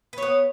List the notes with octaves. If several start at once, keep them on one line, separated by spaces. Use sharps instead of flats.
B3 B4 C#5